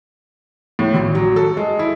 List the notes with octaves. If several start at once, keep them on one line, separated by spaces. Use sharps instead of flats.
A2
G#1
F#3
A4
G#3
E4